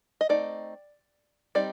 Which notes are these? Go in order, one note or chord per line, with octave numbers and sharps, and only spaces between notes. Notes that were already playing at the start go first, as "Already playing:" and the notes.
D#5
A3 C4 D#4 D5
G3 C4 D#4 D5